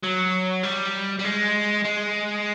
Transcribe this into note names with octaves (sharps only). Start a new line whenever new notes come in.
F#3
G3
G3
G#3
G#3